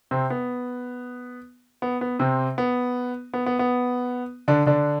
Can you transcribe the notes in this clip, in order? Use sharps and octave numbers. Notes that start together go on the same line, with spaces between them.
C3 C4
B3
B3
B3
C3 C4
B3
B3
B3
B3
D3 D4
D3 D4